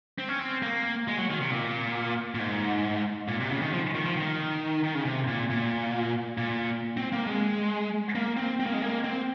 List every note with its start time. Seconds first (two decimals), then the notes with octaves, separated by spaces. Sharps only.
0.18 C4
0.29 C#4
0.39 C4
0.63 A#3
1.08 G#3
1.18 F#3
1.30 D#3
1.40 C3
1.51 A#2
2.35 A#2
2.39 G#2
3.28 A#2
3.40 C3
3.51 C#3
3.62 D#3
3.73 F3
3.95 D#3
4.05 F3
4.17 D#3
4.84 D#3
4.94 C#3
5.05 C3
5.27 A#2
5.50 A#2
6.38 A#2
6.97 C4
7.12 A#3
7.26 G#3
8.15 A#3
8.37 C4
8.60 C4
8.66 A#3
8.73 G#3
8.82 A#3
9.04 C4